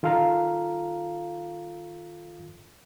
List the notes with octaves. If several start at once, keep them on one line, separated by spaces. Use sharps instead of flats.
D#3 F4 A4 F5 A#5